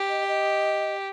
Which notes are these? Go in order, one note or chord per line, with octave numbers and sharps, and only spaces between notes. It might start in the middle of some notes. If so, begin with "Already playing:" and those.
Already playing: G4
D#5
D#5